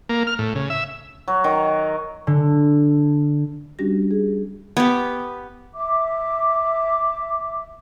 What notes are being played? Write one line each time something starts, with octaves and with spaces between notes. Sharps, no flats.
A#3
F6
A2
C#3
E5
F#3
D#3
D3
G3 C#4 D4 F#4 G4 A#6
G#4
B3 G4
E5 D6